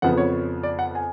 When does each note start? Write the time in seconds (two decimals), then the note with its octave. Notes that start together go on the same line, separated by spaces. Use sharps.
0.02 F2 C#3 F3 B3 F#5
0.17 C#5
0.63 D5
0.79 F#5
0.95 G#5